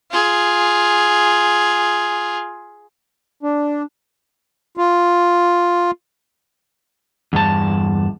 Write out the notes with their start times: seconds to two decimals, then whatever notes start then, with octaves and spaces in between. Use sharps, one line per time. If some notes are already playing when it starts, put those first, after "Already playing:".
0.12 F4 G#4
3.43 D4
4.77 F4
7.33 E2 G2 A5